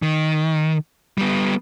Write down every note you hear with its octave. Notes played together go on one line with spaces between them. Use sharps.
D#3
G3 B3